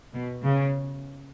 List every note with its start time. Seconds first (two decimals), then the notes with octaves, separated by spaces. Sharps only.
0.13 B2
0.44 C#3